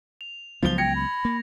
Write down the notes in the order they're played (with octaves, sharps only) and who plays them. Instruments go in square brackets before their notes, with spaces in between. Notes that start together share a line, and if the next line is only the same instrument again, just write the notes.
[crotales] F7
[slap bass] C#2 F#3 B3 [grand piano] F3 G7
[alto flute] G5 [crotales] G#6 A#6 [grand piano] C#7
[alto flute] B5
[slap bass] A#3